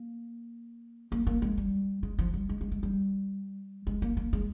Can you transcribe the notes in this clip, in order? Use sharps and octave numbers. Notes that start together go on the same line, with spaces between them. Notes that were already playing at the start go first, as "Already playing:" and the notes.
Already playing: A#3
A#3
A#3
G#3
G3
G#3
F3
G3
G#3
G#3
G#3
G3
G#3
A#3
A#3
G#3